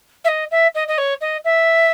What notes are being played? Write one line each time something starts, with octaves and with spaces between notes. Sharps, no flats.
E5
D#5
E5
D#5
D#5
C#5
D#5
E5